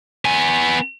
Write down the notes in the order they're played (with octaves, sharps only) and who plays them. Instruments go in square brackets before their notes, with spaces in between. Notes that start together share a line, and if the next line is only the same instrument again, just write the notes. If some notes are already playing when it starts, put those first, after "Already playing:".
[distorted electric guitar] B3 G#5